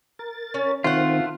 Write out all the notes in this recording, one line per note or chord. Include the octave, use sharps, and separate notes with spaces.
A#4 A6
C#4
D#3 A3 C4 F4 F#5